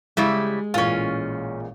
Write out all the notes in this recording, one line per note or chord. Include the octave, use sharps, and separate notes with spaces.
C#3 G3 G#3 E4 G4
A1 A#2 C#4 F4